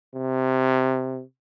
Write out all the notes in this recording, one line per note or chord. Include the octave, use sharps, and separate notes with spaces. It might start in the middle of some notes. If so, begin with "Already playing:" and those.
C3